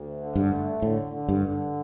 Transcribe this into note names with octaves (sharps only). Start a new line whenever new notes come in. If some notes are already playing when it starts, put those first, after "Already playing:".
Already playing: D2
D3
G2
A3
A2 D3
D3
G2
D3